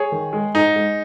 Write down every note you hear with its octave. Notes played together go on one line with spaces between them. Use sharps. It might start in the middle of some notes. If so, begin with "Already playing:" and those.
Already playing: G#4 C#5
D#3
G#3
G#2 D#4
G#3